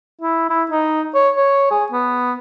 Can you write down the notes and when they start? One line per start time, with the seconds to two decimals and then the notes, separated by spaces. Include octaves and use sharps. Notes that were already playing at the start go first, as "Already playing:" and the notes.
0.21 E4
0.50 E4
0.71 D#4
1.15 C#5
1.36 C#5
1.71 G#4
1.92 B3